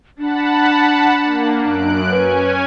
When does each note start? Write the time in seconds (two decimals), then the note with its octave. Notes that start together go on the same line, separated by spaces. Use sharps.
0.19 D4 F#5 A5 B5
1.23 A#3
1.63 F#2 F#6 D7
2.10 C#4 B4 G#5